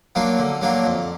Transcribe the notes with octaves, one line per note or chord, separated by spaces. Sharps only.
F#3 A#3 D4 F4
D3
F#3 A#3 D4 F4
F2